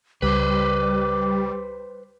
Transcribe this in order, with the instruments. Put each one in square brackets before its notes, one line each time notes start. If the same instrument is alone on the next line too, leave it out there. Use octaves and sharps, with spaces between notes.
[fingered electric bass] C#2 [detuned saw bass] G3 [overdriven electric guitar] B4 C5 [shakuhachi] D6